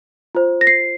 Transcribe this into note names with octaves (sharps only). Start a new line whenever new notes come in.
F4 C5
A#6
C7